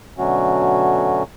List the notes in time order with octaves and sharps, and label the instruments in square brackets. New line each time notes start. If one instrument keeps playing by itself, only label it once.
[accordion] B2 D3 F#3 A3 C#4 F#4